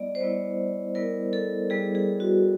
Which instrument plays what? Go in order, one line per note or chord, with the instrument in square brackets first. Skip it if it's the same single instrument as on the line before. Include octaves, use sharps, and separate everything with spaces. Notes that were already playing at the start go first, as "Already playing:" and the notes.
Already playing: [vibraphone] G3 B3 E4 D5 D#5
C5
G3 B3 E4 C#5
G3 B3 E4 A#4
A4
G3 B3 E4 G#4
G#4
F#4